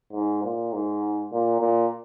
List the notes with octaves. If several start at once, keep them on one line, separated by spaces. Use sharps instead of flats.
G#2
A#2
G#2
A#2
A#2